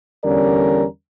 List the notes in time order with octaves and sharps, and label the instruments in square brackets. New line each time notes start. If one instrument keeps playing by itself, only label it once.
[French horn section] E2 D3 G3 C#4 A#4 D5